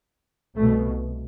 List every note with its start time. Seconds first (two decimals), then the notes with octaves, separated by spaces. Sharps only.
0.55 C2 B2 A3